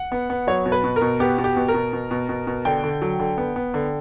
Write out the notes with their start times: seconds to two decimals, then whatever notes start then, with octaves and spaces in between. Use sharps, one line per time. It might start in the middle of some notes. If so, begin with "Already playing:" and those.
Already playing: F#5
0.12 B3
0.30 B3
0.47 F#3 C#5
0.66 B2
0.72 B4
0.84 B2
0.96 A#4
1.02 B2
1.20 B3 G4
1.38 B2
1.44 G4
1.56 B2
1.68 A#4
1.74 B2
1.93 B2
2.11 B2
2.29 B2
2.47 B2
2.65 D3 G5
2.84 D3
3.02 F#3
3.20 D3
3.38 B3
3.56 B3
3.74 D3